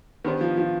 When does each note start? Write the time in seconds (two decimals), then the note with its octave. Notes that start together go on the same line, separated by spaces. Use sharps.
0.24 D#3 B3 D4 G4 C5
0.41 F3
0.57 F3